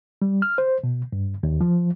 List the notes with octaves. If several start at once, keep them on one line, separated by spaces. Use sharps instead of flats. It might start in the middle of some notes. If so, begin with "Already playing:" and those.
G3
F6
C5
B2
G2
D#2
F3